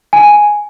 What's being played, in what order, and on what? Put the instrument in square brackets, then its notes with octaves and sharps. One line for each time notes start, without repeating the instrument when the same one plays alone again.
[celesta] G#5